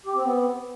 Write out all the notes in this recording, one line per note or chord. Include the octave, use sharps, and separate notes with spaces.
G4
C4
B3